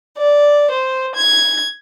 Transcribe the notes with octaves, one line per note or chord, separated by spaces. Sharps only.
D5
C5
G#6